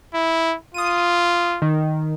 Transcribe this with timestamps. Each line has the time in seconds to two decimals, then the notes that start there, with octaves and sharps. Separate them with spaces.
0.14 E4
0.74 F4 D#6 D#7
1.62 D#3